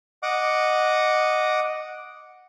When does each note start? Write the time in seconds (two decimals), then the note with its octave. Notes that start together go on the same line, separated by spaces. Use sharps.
0.23 D#5 F#5 D6